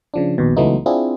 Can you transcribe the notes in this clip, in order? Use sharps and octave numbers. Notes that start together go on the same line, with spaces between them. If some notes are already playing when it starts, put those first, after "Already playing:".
C#3 F3 D4
A#1 D#2 B2
C#2 E3 F#3 A3 B3 D#4
C4 D4 E4 F4 G#4